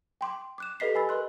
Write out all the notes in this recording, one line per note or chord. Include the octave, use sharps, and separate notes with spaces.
G5 C6 D6
D6 F#6 E7
G4 A4 B4 D#5 B6 C7
B4 G#5 B5 E6 A6
A#4 B4 D#5 C6 F#6